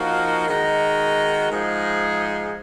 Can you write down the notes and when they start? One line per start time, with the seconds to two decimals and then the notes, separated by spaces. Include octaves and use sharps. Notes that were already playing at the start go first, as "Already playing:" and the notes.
Already playing: F3 A#3 D#4 F#4
0.47 D#3 G#3 D#4 F#4
1.50 G#2 F3 G#3 D#4 G#4